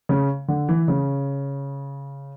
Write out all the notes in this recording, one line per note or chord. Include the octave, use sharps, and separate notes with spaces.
C#3
D3
E3
C#3